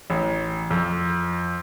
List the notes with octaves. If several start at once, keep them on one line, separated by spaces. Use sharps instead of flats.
A1
F2